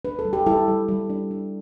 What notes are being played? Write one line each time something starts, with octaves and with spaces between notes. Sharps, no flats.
D4 B4
A4
G3
G4
G3 E4 A4
G3
G3
D4
D4